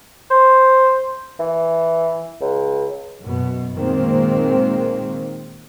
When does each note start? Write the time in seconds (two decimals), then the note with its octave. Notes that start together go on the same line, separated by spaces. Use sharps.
0.30 C5
1.39 E3
2.41 C#2
3.20 F#2 B2
3.74 A#2 D#3 G#3 A#3 C4